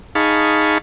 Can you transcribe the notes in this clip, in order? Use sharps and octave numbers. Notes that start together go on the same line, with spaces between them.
D#4 G#4 F5 A5 B5 C#6